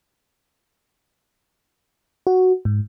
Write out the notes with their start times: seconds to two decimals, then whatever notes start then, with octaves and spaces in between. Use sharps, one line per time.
2.27 F#4
2.65 G#2